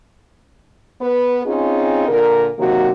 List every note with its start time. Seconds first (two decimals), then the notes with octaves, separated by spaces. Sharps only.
1.01 B3 B4
1.46 C4 C#4 D#4 F4 G#4
2.09 A#2 D3 A#4
2.58 C3 D#3 F#3 A#3 F#4